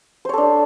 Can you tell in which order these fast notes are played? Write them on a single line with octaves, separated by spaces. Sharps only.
C5 C#5 A4 D4